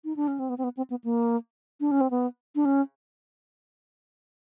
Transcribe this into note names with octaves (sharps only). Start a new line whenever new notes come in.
D#4
D4
C#4
C4
B3
C4
B3
C4
B3
A#3
D4
C#4
C4
B3
D4
C#4